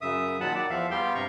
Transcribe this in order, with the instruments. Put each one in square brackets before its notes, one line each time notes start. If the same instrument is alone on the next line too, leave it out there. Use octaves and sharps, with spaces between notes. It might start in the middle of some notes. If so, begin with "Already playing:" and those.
[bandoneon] F#2 C#3 E5 D#6
A#2 D#3 F#3 F#5 A5 B5
D5 F#5
E2 F3 E5 F5
G3 B3 G4 F5 G5 C6
G2 C3 A#5 C#6